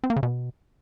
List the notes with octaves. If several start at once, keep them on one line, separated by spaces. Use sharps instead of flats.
C4
A#3
C#3
B2